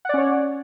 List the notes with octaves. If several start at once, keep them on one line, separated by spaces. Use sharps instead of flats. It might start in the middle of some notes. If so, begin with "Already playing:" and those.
C#4 C#5 D5 F#5